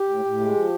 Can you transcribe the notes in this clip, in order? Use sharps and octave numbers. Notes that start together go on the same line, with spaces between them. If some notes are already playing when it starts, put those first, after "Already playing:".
Already playing: G4
A2
A2
G#3
F3